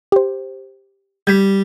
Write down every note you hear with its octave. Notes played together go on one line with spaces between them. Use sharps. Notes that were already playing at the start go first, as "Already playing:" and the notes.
G4 C5
G3 G6 G#6 B6